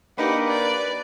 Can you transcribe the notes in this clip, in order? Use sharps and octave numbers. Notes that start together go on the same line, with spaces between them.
A#3 D4 D#4 G4 B4 F#5
D5